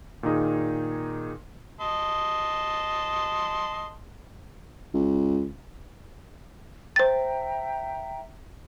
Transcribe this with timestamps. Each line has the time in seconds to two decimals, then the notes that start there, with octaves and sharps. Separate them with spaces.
0.23 A#2 D#3 D#4 G#4
1.81 D#5 A5 C6
4.94 C#2
6.96 C5 E5 G5 A#5 A6